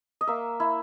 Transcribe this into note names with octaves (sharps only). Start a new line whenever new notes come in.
D#5
A#3 E5
E4